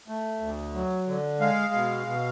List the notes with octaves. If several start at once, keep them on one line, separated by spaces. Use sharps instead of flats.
A3
D2
F#3
D3
G#3 F5
B2
B2